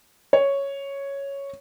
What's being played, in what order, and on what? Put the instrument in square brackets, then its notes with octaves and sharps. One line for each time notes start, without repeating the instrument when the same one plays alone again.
[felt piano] C#5